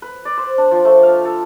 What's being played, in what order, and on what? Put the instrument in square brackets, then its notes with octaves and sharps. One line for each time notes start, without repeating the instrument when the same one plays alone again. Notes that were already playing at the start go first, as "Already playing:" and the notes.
[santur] B4
D5
C5
D4
F3
A3
F5
A4